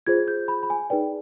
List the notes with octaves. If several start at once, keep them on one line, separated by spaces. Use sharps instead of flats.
F4 G#4 C5 G#6
G6
B5
B5
G#5
D#4 G#4 B4 D5 G5